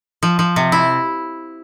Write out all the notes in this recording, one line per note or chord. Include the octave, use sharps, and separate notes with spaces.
F3
F3
C3
E4